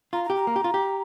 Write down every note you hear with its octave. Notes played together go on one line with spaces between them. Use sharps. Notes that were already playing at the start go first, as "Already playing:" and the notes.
F4 A#5
A#5
G4
A#5
A#3
G4
F4
G4